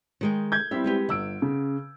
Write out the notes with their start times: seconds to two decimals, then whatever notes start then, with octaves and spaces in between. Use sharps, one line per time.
0.21 D#3 G#3 G5
0.52 G6 G#6
0.71 G3 C4 E4 G4 E5
0.84 G#3 B3 G4
1.09 G1 F#5 E6 D7
1.42 C#3